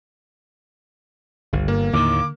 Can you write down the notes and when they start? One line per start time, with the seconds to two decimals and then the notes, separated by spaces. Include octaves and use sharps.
1.53 G1 C#2
1.68 G2 A#3
1.93 D#2 A2 D3 D#3 D6